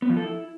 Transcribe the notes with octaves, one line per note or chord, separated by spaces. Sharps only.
B3
F3
A4
E4